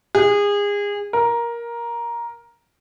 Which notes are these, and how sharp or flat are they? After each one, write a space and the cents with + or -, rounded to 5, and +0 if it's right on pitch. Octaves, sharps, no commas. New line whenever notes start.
G#4 -30
A#4 +10